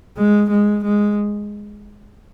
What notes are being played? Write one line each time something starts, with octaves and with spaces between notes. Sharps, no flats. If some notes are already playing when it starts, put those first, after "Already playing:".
G#3
G#3
G#3